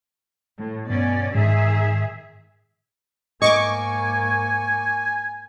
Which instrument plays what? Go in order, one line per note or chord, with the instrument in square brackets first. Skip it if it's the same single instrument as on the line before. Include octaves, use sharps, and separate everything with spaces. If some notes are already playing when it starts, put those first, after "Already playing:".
[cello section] A2
[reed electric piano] G2 [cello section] B2 C#4 D5
[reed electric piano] G#2 [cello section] D#3 G#4 E5
[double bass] G#2 A#3 [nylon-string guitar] D#5 [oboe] G#5 [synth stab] C#6 D6